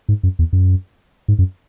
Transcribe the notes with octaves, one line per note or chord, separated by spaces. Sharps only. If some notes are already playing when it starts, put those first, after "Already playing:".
G#2
F#2
E2
F#2
G#2
F#2